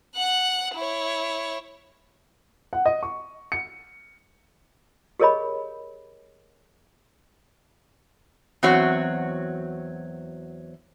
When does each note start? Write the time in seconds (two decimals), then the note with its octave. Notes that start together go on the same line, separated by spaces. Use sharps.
0.16 F#5 F#6
0.74 E4 C#5
2.73 F#5
2.86 D#5
3.03 C#6
3.52 C#7
5.20 G4 G#4 A#4 C#5 D#5 B5
8.63 E2 F#3 C4 F#4 C#5